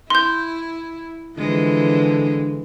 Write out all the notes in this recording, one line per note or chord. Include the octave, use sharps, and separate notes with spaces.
E4 C6 G6
D3 E3 F3 G#3